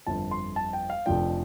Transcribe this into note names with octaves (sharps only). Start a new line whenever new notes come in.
G1 F2 F3 A5
C6
A5
G5
F5
F1 F2 F3 D4 G5